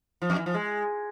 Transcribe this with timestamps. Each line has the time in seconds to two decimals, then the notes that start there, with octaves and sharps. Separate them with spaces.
0.22 F3
0.30 F2
0.38 E3
0.46 F3
0.54 G#3